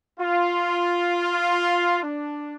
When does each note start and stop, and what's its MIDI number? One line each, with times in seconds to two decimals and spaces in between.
0.20 1.99 65
2.03 2.55 62